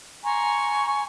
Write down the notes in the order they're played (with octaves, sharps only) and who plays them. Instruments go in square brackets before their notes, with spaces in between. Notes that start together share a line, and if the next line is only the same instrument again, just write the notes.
[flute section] G#5 A#5 C6 C#6